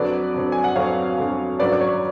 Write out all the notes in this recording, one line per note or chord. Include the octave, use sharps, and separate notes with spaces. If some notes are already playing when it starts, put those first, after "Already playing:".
Already playing: F2 D3 F#3 B4 D5
F2 D3 F#3
G#5
F#5
F2 D3 F#3 C#5 F5
F2 D3 F#3
G#1 F#2 D3 F#3 B4 D5
D5
C#5